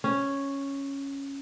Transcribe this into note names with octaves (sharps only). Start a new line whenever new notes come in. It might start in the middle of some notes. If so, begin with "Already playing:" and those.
C#4